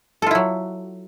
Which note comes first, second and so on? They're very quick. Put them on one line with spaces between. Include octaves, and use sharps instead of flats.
A4 F4 E4 F#3